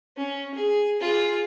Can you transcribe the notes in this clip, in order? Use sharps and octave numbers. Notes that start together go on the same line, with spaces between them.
C#4
G#4
F4 G#4